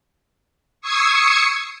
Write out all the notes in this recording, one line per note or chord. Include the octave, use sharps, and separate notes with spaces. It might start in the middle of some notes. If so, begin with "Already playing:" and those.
C#6 D#6 E6 G#6 C7 C#7